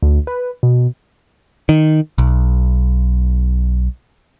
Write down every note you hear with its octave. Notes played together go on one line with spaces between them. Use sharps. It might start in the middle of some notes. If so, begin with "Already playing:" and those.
D2
B4
B2
D#3
B1